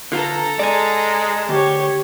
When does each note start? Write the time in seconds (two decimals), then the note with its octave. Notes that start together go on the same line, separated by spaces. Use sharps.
0.12 D3 F4 A4 B4 A#5
0.59 G#3 D5 G#5
1.49 D2 G4 C#5